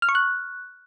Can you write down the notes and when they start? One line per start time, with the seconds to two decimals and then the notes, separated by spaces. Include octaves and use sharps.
0.02 F6
0.09 C#6
0.15 F#6